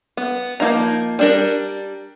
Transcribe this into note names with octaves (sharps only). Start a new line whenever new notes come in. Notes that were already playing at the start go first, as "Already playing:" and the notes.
B3
F3 A#3 D#4 A#5
G3 D4 A#4